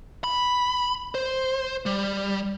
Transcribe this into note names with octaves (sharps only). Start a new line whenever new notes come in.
B5
C5
G3